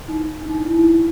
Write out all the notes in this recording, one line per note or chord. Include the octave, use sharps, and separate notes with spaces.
D#4
D4
D#4
D4
E4
D#4